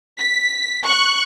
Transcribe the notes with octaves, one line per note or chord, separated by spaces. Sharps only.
B6
C#6 F#6